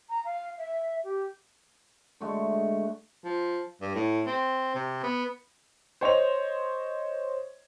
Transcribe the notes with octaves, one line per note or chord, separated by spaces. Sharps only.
A#5
F5
E5
G4
D3 G#3 A3 F#4
F3
G2
A2
C4
C3
B3
C5 C#5 D#5 F7